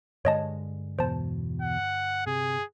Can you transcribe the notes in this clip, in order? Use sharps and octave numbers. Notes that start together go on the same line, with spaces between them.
G2 D3 G#3 C#5 D#5 A5
E2 B2 C5 A5
F#5
C3 G#4